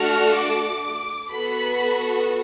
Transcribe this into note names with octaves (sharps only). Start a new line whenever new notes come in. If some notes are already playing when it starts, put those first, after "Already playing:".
Already playing: A3 D4 F#4 A4 F6
D6
B3 F#4 A4 B5